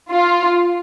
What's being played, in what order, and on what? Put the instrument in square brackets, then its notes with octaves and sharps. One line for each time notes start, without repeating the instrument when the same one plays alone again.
[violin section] F4